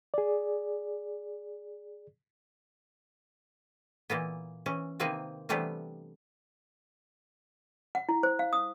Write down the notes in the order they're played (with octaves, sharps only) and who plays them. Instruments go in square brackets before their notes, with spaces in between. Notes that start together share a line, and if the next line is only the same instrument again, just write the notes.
[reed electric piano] G#4 D5
[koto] A#2 E3 A#3 B3
E3 C#4
C3 D#3 A#3 C4 B4 G#5
C3 E3 G3 A3 B3 D4
[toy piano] F#5
E4
C5
F5
D#6